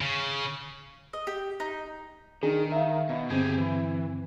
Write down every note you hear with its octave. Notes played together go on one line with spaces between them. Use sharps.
C#3
D#5
G4
D#4
D#3 D4 D#4 G#4
E5 F5
B2
G2 D3 C4 G4 G#4
E3